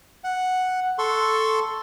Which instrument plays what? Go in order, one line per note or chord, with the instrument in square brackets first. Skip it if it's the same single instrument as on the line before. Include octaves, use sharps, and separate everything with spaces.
[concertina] F#5
A4 C6 C#6